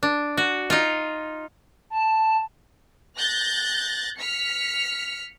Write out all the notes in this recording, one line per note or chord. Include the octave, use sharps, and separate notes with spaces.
D4
F#4
D#4 F4
A5
F#6 G6 A6 A#6
F6 B6 C#7